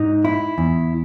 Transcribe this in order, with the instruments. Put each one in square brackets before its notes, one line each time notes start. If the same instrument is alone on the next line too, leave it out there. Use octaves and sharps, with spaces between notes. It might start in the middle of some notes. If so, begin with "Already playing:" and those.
Already playing: [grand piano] G#2 [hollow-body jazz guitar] D#4
[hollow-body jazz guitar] E4
E2